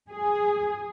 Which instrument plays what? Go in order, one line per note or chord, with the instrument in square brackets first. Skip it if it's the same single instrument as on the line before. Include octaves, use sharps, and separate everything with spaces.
[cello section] G#4